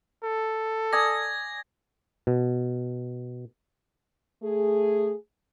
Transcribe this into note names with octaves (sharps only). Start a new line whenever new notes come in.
A4
D5 G#5 D#6 G#6 A#6
B2
A3 G#4